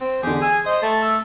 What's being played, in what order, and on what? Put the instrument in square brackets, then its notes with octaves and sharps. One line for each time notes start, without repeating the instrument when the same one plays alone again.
[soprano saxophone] C4
[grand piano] E2 D3 [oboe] G4 [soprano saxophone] G#4
[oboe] G#5 [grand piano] E6
[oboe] C5 [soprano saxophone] D#5
[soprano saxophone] A3 [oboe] A5
[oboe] A4